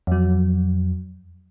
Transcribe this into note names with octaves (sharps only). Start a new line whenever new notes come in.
F2 F#3